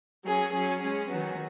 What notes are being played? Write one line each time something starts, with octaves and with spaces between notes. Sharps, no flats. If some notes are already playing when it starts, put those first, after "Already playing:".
F#3 C#4 G#4
F#3 C#4 G#4
G#3 C#4 G#4
D#3 F#3 B3 F#4